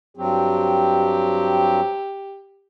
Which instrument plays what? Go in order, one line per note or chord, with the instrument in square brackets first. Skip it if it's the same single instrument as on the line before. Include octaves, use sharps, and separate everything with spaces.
[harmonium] G2 F#3 C4 [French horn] G4